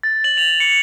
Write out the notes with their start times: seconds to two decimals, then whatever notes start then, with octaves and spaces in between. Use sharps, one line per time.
0.03 A6
0.24 F#7
0.37 F7
0.60 C#7